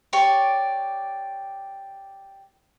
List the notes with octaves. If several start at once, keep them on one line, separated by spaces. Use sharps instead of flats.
G4 C#5 D5 C#6